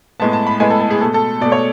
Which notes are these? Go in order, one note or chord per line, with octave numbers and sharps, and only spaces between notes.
A2 G#3 B3 A5
A5
B5
A2 G#3 B3 G#5
A4
A4
G#4
B2 A3 A4
A4
B2 A3 D5
C#5